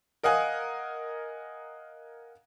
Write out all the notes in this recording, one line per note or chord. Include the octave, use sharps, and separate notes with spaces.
A#4 D#5 F5 F#5 G#5